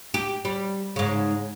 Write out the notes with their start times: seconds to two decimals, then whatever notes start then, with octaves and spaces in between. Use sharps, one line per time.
0.14 G4
0.45 G3
0.96 G#2 C#3